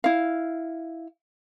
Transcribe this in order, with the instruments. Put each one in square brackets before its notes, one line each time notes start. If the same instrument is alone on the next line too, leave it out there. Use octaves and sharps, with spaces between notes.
[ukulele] E4 F5